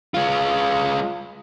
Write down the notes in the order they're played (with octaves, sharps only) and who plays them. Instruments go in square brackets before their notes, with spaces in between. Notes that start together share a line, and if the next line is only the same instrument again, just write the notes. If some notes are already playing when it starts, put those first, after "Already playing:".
[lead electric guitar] G#3 F4